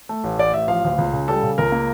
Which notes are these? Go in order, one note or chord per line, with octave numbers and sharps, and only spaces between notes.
A3
A1
A1 D5
A1 E5
F3 F5
D2
C#2
C#3
G3 A4
C#3
C#2 A#4
A#3